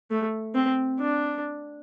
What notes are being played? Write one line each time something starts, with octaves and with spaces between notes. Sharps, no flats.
A3
C4
D4